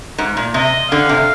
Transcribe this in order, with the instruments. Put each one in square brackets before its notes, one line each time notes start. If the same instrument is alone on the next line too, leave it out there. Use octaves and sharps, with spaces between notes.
[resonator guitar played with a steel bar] G#2
A#2
[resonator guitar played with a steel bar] C3 [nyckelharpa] D#5
[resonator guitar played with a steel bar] D3 [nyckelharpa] F5
[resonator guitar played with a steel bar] C3